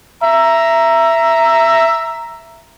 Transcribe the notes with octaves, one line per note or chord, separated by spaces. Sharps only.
E5 A#5